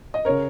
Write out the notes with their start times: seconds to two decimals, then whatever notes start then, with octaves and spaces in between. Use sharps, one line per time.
0.14 D#5
0.25 C#3 A#4 C#5